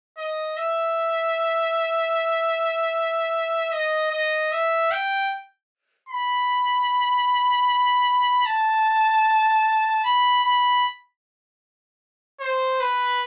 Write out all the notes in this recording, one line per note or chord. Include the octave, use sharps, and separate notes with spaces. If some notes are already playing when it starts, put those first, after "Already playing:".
D#5
E5
D#5
D#5
E5
G5
B5
A5
B5
B5
C5
B4